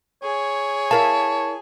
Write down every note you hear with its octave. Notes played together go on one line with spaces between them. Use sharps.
G#4 C#5
E4 A#4 F5 A5